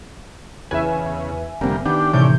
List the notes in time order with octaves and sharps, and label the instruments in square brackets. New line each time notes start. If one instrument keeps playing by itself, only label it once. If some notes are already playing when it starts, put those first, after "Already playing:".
[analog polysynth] E2 B4 [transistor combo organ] C#3 [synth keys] E5 G#5
[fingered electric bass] F1 C4 [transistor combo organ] D3 G3 A#3
[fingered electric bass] D#3 [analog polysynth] B3 [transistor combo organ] D4 G4
[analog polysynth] A2 [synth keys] C3 E3 G6 [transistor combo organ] A3 C#4 D5